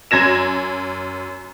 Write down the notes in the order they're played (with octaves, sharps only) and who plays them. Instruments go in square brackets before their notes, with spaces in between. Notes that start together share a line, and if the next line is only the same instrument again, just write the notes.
[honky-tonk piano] F#2 G#6 A#6 E7